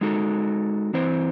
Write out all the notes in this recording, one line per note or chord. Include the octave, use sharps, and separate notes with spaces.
G#3 D#4 F#4 A4
E3 C4 E4 C5